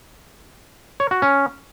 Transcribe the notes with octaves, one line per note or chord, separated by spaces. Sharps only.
C#5
F#4
C#4